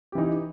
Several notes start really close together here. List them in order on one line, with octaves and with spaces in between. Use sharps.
G4 E3 D#4